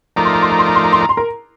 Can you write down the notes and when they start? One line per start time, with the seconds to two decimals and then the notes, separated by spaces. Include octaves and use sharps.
0.16 F3 A3 D#4 A#4 D5 A#5
0.25 C6
0.33 A#5
0.42 C6
0.50 A#5
0.59 C6
0.67 A#5
0.75 C6
0.84 A#5
0.92 C6
1.01 A#5
1.09 C6
1.17 A#4 A#5